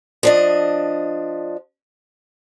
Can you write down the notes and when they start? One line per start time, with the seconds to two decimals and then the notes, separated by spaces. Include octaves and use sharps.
0.23 F3 D4 D#5